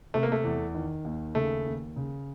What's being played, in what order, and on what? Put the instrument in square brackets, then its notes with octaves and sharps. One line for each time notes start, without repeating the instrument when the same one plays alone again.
[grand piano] C3 [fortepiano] A3
[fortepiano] A#3
A3
[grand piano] E2
D#3
D#2
[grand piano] C#3 [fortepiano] A3
[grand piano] D#2
C#3